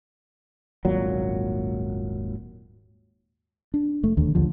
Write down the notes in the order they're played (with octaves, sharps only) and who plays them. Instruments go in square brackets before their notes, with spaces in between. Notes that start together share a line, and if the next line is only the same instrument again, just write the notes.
[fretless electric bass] D#1 G#1 A#2 F#3
[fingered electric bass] D4
F1 A3
E1 D#2 D3
A#1 D#2 D3 F3